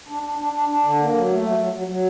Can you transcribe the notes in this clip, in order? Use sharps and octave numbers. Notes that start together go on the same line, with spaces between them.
D4
D4
D4
D4
D4
D3
A#3
F#3
A3
F#3
F#3
F#3
F#3